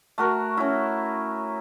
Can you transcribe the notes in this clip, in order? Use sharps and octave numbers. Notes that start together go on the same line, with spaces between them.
A3 F#4 A#4
C#4 E4